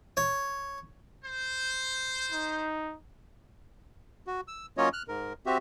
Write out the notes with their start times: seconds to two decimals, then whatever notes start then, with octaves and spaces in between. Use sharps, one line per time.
0.17 C#5
1.24 C5
2.32 D#4
4.27 F#4
4.48 E6
4.77 F#3 A#3 C#4 F4 C#5 D#5
4.93 F6 F#6
5.08 G#2 A#4
5.46 C4 F#4 G4 E5